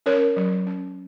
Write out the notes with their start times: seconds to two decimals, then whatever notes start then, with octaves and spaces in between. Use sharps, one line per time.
0.06 C#4 A#4 C#5
0.36 F#3
0.67 C#4